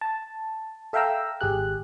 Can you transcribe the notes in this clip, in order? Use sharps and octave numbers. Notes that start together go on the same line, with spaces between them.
A5
A4 E5 F5 G5 A#5 E6
G#1 G4 G#4 F#6